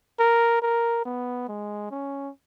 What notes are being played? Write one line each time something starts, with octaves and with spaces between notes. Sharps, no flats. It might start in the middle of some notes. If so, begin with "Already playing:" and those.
A#4
A#4
B3
G#3
C#4